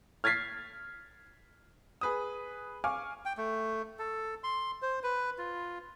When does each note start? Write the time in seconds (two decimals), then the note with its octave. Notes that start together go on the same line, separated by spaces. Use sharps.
0.24 F6 G#6 A6 B6 C7
2.01 G#4 B4 D#6
2.84 F5 G#5 C#6 D6 F6
3.25 G5
3.37 A3
3.99 A4
4.44 C6
4.82 C5
5.03 B4
5.38 F4